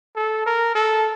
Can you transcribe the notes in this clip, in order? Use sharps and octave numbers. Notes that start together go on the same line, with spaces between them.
A4
A#4
A4